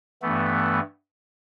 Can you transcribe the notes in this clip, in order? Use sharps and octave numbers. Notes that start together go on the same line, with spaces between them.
G2 E3 A3 B3